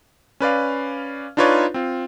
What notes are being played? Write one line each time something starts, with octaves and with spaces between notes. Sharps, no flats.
C#4 B4 D5 F5
D4 D#4 F4 B4 C#5 D5
C4 F4